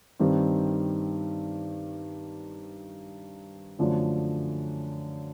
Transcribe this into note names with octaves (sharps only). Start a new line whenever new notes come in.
G2 D#3 G3 C4
F#2 D3 F3 A3